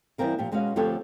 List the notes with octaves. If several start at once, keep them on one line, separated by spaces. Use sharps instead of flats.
E3 G3 B3 C4 A#4 F5
A#2 F3 G4
B2 G#3 C#4 F#4 F5
D2 F3 C4 G4 A4 C#5